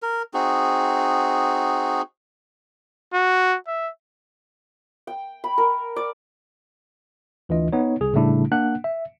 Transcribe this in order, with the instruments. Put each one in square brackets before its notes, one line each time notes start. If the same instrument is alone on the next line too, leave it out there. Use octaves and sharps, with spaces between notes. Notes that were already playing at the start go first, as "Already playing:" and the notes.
[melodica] A#4
C4 D#4 F#4 G#4
[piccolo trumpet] F#4
E5
[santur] G5
B5
A#4
D5
[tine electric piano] D2 E3 D4 F4 D#5
B3 D#4 C#5
C2 G#4
A2 C#3 G3 A3 D4 E4
A#3 D4 F#5 F#6
E5